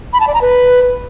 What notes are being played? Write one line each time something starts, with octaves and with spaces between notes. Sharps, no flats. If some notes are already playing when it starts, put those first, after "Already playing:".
B5
A5
D5
A#5
B4